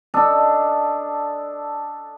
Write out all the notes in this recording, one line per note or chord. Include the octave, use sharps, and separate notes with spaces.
D4 A4 D#5